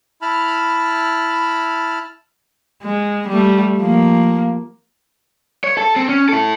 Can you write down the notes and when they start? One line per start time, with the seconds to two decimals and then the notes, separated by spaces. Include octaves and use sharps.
0.22 E4 A5 B5 F6
2.83 G#3
3.28 G3 A3
3.77 F3 A#3
5.64 C#5
5.78 A4
5.96 C4
6.09 C#4
6.29 E4 A4